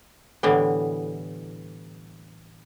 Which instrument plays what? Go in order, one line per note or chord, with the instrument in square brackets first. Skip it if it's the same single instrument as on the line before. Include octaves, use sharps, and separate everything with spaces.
[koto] A2 D3 E3 G3 B3